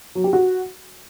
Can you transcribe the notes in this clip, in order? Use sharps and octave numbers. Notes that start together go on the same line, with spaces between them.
F#3
G4
F#4